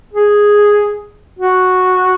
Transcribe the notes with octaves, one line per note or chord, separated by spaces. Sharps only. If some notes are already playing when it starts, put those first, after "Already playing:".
G#4
F#4